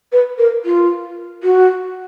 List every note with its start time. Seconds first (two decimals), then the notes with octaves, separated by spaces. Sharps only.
0.13 B4
0.38 A#4
0.65 F4
1.43 F#4